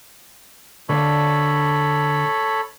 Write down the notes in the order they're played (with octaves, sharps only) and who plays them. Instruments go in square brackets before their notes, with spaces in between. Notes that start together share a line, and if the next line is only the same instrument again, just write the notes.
[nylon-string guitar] D3 F5 [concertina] A4 C#5 B5